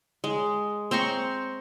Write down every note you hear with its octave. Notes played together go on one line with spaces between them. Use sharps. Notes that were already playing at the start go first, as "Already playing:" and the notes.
G#3
C4 A#5 C6 C#6